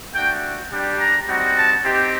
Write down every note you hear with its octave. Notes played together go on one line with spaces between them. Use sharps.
A3 D4 F#4 G5
G3 D4 G4
A#5
G3 C4 D#4 F#4
A5
C4 D#4 G4